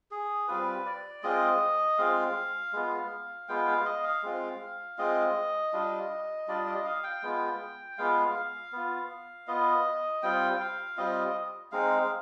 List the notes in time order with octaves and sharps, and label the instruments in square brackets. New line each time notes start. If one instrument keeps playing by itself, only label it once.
[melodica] G#4
G3 C4 F4 B4
D5
G#3 C4 F4 D#5
G#3 C4 F4 F5
G#3 B3 F4
G#3 B3 F4 G5
F5
D#5
F5
G#3 C4 F4
G#3 C4 F4 D#5
G3 D4 F4
G3 D4 F4 D5
D#5
F5
G5
G#3 B3 F4
G#3 B3 F4 F5
F5
B3 F4
B3 F4 D#5
G3 C4 F4 G5
F5
G3 C4 F4 D#5
G#3 C4 D#4 F5